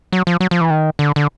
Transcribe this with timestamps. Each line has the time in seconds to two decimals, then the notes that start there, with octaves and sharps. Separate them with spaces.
0.12 F#3
0.27 F3
0.40 F#3
0.51 F3
0.61 E3
0.70 D#3
0.99 D3
1.16 D3